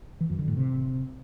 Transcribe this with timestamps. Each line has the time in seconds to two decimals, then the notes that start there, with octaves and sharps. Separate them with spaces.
0.21 E3
0.30 F#2
0.39 D3
0.48 A2
0.57 C3